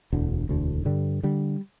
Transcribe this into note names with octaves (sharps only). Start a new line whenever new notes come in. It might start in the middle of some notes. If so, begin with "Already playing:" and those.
E1 D2 D3
E1 D2 D3
G2 D3 G3
D3 G3